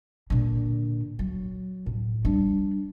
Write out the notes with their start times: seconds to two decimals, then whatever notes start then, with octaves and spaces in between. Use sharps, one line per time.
0.30 A#2 D3
1.19 F#3
1.86 A2
2.25 G3 D4